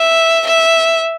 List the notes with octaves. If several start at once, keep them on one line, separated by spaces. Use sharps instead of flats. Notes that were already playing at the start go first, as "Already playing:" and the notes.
Already playing: E5
E5